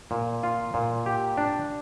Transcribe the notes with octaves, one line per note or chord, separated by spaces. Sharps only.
A#2
F4
A#2
G4
D4